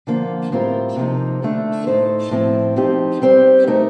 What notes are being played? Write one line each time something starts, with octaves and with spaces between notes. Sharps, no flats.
D3 F3 A#3
A2 G3 C4 F4 A#4
C3 F3 A#3 D#4
D3 A3 D4 A4
A2 A3 D#4 A4 C5
A2 F3 C4
F3 C4 D#4 G4
G3 C4 G4 C5
A3 D#4 A#4